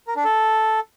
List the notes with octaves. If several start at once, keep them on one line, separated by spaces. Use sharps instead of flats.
A#4
D4
A4